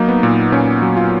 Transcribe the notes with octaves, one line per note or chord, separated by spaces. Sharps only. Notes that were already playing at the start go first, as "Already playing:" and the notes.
Already playing: F#3 A#3 D#4
B3
A#2
A#2 C#4
F#3
F4